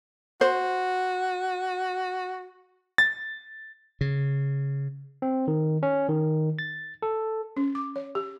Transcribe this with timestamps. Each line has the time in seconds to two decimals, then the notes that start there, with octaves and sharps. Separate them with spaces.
0.41 F#4 C5
2.98 A6
4.01 C#3
5.22 C4
5.48 D#3
5.83 C#4
6.09 D#3
6.59 A6
7.02 A4
7.57 C#4
7.75 D6
7.96 C#5
8.15 G4